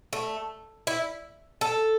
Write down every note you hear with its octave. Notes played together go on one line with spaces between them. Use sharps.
A3
E4
A4